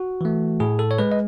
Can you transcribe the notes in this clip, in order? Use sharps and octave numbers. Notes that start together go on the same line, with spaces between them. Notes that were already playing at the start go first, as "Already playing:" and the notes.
Already playing: F#4
E3 A3
A2 G#4
A4
C#5
G#3 B4
D#5